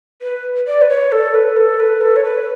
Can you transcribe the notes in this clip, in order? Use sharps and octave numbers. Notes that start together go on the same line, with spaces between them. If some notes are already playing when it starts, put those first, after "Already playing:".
B4
D5
B4
C#5
A4
B4
A4
B4
A4
C#5
B4